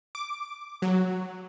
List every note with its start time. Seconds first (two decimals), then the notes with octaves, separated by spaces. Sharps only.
0.15 D6
0.82 F#3